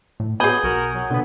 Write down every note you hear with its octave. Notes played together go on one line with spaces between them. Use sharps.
A2
F#3 B3 G#4 G#5 B5 D#6 G6
B1 F#4 A#4
F#3
B2 D3 B3